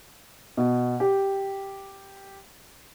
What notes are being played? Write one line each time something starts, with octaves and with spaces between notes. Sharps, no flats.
B2
G4